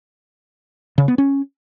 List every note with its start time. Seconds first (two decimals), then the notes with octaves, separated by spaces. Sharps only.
0.98 C#3
1.08 B3
1.18 C#4